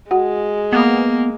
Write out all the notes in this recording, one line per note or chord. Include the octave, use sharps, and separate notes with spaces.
G#3 F#4 F#5
A#3 B3